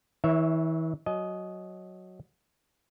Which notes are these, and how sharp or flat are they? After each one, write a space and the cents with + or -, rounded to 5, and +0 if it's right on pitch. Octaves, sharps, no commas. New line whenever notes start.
E3 -35 C#5 +5 E5 +0
F#3 +0 D#5 +0 G#5 +45